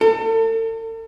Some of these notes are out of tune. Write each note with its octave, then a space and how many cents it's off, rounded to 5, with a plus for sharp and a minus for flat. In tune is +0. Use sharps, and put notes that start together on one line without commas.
A4 +40